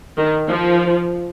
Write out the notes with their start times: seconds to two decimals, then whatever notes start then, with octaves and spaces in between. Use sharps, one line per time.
0.19 D#3
0.47 F3